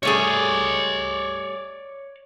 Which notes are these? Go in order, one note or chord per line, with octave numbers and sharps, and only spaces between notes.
G3 A3 G#4 C#5 D5